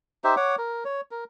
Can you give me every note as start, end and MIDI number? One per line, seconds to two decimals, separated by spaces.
0.24 0.35 63
0.24 0.35 67
0.24 0.35 72
0.24 0.35 76
0.37 0.56 73
0.37 0.56 78
0.37 0.56 86
0.58 0.84 70
0.85 1.01 73
1.11 1.24 70